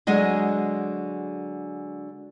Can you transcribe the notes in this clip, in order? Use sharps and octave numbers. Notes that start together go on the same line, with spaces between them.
D3 F#3 G#3 D#5 G#5